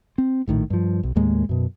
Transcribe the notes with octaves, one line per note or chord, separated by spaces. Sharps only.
C4
A#1 A2 D#3
G2 F3
B1
D#2 A2 G#3 A#3
F#2 B2